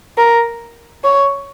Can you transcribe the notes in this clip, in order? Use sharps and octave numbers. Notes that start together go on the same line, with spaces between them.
A#4
C#5